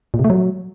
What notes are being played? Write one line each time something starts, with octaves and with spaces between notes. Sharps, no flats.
A#2
C3
A3
F#3